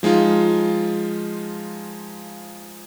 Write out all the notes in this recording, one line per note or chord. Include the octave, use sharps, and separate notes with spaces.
F3 G#3 D#4 F4